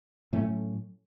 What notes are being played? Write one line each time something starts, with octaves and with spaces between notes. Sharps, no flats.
A2 F#3 A3 C#4